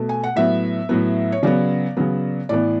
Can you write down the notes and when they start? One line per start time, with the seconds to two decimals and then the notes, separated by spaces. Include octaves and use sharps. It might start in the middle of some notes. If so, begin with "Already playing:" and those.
Already playing: B2 A3
0.09 G#5
0.24 F#5
0.36 A2 F#3 B3 E5
0.89 A2 F#3 B3
1.32 C#5
1.43 C#3 F#3 B3 D5
1.97 C#3 F#3 B3
2.49 A2 E3 B3 D5